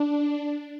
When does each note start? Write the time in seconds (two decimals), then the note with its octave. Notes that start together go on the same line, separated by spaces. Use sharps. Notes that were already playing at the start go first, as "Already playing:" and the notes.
Already playing: D4
0.30 D4